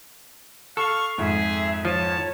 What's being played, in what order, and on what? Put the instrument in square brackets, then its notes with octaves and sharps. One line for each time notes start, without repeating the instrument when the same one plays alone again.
[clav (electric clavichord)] A4 [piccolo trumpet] F5 [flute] C#6
[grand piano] F2 G#2 [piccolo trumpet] G#4 [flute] E5
[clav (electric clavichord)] F3 [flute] C#5 [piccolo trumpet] A5